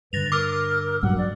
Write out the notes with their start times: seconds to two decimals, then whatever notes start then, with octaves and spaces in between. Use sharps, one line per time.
0.13 G2 D3 B4 A6 A#6 F7
0.32 A#4 D6 E6 F6
1.03 A#1 G2 F#3 F#5
1.18 D5